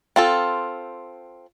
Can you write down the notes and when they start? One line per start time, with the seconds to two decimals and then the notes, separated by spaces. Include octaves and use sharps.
0.16 C4 F4 A4